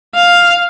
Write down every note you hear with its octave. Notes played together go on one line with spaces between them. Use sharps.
F5